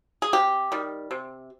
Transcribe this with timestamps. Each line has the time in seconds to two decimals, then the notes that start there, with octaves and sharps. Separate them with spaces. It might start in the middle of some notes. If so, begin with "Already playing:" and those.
0.22 G#4
0.33 C3 G4
0.72 D#3 G3
1.11 C3